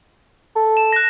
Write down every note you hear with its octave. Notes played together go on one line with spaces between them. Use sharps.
A4
E7
F#6 A#6